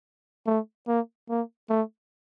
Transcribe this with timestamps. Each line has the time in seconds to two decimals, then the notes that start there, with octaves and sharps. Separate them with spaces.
0.46 A3
0.87 A#3
1.29 A#3
1.70 A3